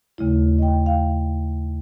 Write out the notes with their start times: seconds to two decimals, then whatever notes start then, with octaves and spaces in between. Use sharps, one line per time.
0.18 D#2 C#3 A3 E4
0.59 D#5 G5
0.86 F5 G5